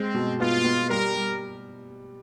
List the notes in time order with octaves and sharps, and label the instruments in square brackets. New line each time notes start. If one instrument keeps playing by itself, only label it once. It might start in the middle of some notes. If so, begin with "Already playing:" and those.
Already playing: [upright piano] G#3 [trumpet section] C4
[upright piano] B2
[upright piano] B3 [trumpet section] F4
[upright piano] B3
[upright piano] G3 [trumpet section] A#4
[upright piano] G3